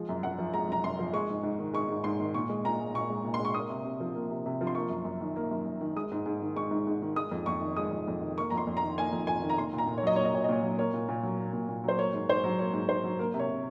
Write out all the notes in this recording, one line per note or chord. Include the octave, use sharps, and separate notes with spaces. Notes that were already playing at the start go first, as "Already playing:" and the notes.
Already playing: F3 G#3
F#2
F#2 F#5
F3
G#3 A#5
F#2 A#5
F#2 C6
F3
G#3 C#6
G#2
G#2
D#3
G#3 C#6
G#2
G#2 C6
D#3
A#2 C#6
G#3
A#2 A#5
G#3
A#2 C#6
G#3
A#2
C6
G#3 C#6
A#3 D#6
C3
C3
F3
A#3
C3
C3
F3
C6
A#3 C#6
F#2
F#2
D#3
A#3
F#2
F#2
D#3
G#3 D#6
G#2
G#2
D#3
G#3 C#6
G#2
G#2
D#3
G#3 D#6
F2
F2 C#6
D#3
G#3 D#6
F2
F2
D#3
A#3 C#6
F2 A#5
C6
F2
A#5
D#3
A#3 G#5
F2
F2 G#5
D#3
A#5
A#3 C6
A#2
A#5
A#2
C#5
F#3 D#5
A#3 C#5
D#5
A#2 C#5
D#5
A#2 C#5
F#3
A#3 C#5
A#2
A#2
F#3
A#3
A#2
A#2
F#3 C5
A#3 C#5
G#2
G#2 C5
F#3
A#3 C#5
G#2
G#2 C5
F#3
A#3 A#4
C3
C#5
C3